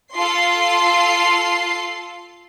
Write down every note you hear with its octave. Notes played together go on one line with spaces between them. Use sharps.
F4 A4 C6 C7